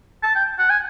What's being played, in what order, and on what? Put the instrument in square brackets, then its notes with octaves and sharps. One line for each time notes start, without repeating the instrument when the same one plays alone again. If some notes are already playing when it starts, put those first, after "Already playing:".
[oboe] A5
G5
F#5
G#5